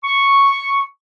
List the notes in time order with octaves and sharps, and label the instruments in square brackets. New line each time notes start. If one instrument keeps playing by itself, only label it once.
[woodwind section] C#6